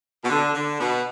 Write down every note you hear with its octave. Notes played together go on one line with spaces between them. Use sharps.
B2
D3
D3
B2